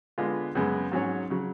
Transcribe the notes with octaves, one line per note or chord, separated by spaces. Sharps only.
D3 G#3 B3 F4 B4
F#2 C#3 G#3 B3
G#2 F#3 C#4 G#4 C#5
C#3 F#3